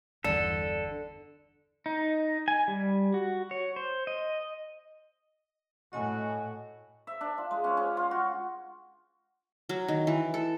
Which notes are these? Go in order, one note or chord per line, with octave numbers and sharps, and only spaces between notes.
G1 E2 D3 A4 D5
D#4
G#5
G3
F#4
C#5
C5
D#5
A2 F#4 D#5 G#5
E5
D4
F4
G#3
C#4
C#4
F4
F#4
F#3
D#3
E3
A4